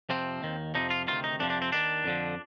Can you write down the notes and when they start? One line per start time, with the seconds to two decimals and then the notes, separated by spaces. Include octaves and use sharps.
0.09 F2 C3 F3 C4
0.42 D#2 D#3
0.75 F2 C3 F3 D#4
0.90 F4
1.07 D2 C3 D#3 F4
1.24 D#4
1.40 F2 C3 F3 D4
1.50 D4
1.62 C4
1.72 D#2 D#3 D4
2.05 F2 D3 F3